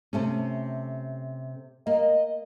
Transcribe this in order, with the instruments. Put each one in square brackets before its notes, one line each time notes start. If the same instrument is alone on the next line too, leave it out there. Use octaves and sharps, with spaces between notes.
[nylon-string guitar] C3 A3 C#4
[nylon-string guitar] A#3 [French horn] D#5